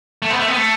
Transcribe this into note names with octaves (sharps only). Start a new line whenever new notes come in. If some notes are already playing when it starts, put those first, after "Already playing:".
A3
B3
A3
B3
A3